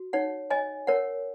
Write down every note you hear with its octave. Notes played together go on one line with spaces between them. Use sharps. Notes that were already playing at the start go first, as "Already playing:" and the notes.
Already playing: F#4
D#4 C#5 F#5
C#5 D#5 G#5
A#4 C#5 F#5